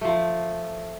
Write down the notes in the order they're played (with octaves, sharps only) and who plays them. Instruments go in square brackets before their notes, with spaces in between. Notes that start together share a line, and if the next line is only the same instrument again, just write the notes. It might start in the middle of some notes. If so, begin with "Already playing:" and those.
[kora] F3 A3